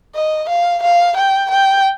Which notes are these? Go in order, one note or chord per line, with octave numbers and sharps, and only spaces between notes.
D#5
F5
F5
G5
G5